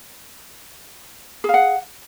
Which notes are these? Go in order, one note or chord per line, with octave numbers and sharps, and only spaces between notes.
G#4 F5 F#5